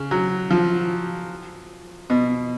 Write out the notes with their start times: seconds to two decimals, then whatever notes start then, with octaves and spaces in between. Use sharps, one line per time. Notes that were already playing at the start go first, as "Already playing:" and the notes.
Already playing: C#3
0.11 F#3
0.50 F3
2.10 B2